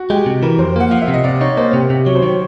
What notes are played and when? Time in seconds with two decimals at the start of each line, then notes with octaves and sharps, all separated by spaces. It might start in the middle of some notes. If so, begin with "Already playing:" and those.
Already playing: F#4
0.10 G#3 G4
0.26 C3
0.43 E3 A#4
0.59 F2 C5
0.76 A#3 F#5
0.91 F3 F5
1.02 E5
1.08 C3
1.14 D#5
1.24 C3 D5
1.41 D#4 C#5
1.57 A#3 C5
1.73 C3 G4
1.90 C3 G4
2.06 F#3 C#5
2.15 C5
2.23 D#3 C#5